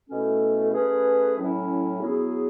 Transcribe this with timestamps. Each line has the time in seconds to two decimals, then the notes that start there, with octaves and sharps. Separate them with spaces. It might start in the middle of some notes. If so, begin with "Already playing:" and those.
0.08 B2 A3 C#4 E4 A4
0.73 A3 C#4 G#4 B4
1.38 A2 F#3 C#4 E4
2.01 F#3 B3 E4 G#4